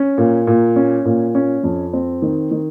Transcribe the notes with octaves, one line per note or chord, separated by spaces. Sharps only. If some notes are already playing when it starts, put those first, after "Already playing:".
Already playing: C#4
A#2
A#2
C#4
A#2
C#4
F2
C4
D#3
D#3